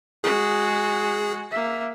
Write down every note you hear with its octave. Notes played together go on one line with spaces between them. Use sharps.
G#3 F#4 G#4
A#3 E5